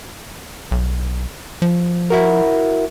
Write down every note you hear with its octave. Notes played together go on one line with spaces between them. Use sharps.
B1
F3
E4 F#4 A#4